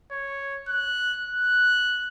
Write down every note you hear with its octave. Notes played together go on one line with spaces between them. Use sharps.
C#5
F#6
F#6